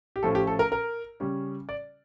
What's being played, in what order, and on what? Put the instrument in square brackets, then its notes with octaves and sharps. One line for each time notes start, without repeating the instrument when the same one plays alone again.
[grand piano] G4
A2 F3 A3 C#4 A4
G4
A4
A#4
A#4
C#3 G3 C#4
D5